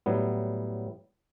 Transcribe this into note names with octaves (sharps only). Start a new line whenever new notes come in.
A2 F#3 G3 B3